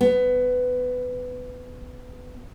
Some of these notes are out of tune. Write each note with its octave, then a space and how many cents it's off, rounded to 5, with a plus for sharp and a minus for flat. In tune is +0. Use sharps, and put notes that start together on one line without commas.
B3 +20